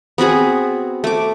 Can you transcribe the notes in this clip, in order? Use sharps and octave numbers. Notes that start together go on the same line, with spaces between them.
B3 C4 F#4 G#4
A3 D6